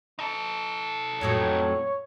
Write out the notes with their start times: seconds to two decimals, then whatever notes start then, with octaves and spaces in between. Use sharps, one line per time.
0.19 D#4 A4
1.21 F2 A2 F#3 C#5